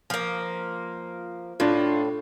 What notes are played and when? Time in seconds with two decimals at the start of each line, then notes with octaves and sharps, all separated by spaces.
0.10 F3 A#3
1.60 A2 D4 F4